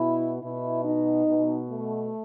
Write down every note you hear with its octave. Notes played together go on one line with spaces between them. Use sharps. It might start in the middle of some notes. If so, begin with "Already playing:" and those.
Already playing: B2 E4
B2 E4
D#4
B2
A3